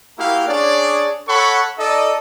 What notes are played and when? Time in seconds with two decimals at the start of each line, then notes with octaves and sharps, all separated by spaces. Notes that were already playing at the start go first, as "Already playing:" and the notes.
0.18 A#3 E4 F#4 G4 A#4 F5
0.47 C#4 D4 G#4 C#5 D5
1.28 A4 C#5 F#5 B5 C#6
1.78 D#4 A4 D5 D#5